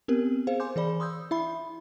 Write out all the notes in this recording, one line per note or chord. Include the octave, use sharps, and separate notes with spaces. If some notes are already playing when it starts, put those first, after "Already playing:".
B3 C4 G4 A#4
G#4 C5 F5
G#5 C6 D6 G6
E3 G#4 D5 B5
C6 D#6 E6 G6
E4 E5 B5